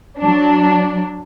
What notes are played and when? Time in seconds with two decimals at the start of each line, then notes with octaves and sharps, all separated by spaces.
0.19 F#3 D4